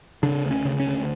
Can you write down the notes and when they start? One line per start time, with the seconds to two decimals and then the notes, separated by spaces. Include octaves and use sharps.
0.23 C#3 D4
0.45 D2
0.51 C#4
0.65 C#3
0.80 C#4
0.86 D2